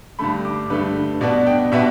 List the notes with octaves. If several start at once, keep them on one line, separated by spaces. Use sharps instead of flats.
G2 D3 A3 B5
D6
G2 D3 A3 B4
B2 B3 D4 D5
G5
B2 B3 D4 E5